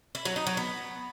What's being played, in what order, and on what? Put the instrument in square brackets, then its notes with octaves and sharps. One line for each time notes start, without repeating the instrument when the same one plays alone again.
[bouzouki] E4
F#3
D#4
F#3
B3